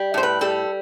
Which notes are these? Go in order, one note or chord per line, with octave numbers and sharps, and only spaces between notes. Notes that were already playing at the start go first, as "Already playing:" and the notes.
Already playing: G3
A2 C5
B4
G3 A4